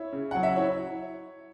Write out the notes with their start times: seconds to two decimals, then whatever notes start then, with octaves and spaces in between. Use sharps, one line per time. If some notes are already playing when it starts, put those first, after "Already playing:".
Already playing: E4 C#5
0.12 C#3
0.31 F#3 F#5
0.43 E5
0.56 E4 C#5